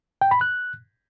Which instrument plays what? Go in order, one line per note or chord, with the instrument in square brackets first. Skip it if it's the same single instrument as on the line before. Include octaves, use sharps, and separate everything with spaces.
[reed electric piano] G5
B5
F#6